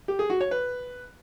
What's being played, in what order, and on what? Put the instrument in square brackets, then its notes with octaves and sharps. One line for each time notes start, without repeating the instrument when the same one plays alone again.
[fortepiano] G4
G#4
F#4
C#5
B4